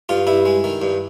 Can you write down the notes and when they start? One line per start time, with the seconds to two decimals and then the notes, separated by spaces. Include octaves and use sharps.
0.09 G2 F4
0.27 G2 E4
0.46 G#3
0.64 D#3
0.82 G2